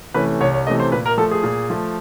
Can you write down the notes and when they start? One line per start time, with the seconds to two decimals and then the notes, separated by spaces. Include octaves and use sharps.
0.14 C3 E3 A3 C#4 B4
0.41 C2 C#5
0.54 C#5
0.67 C3 E3 A3 C#4 D#5
0.80 C5
0.92 A#2 B4
1.06 A#4
1.18 F3 A3 A4
1.31 G#4
1.43 A#2
1.70 F3 A3